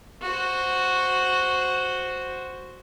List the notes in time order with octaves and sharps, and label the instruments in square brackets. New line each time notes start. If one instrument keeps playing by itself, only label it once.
[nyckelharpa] F#4 C5